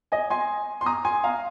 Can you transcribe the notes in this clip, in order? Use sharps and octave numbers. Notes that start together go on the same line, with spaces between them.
D#5 G#5
G#5 C6
C6
A#5 D#6
G#5 C6
F5 A#5